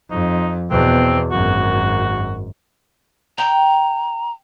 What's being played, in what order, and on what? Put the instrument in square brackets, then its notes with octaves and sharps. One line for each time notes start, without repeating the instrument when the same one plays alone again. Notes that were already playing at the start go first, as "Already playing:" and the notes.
[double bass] F2 [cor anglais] D#4
[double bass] E2 B2 [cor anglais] C4
[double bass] G#1 F#2 [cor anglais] F#4
[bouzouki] G5 [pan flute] A#5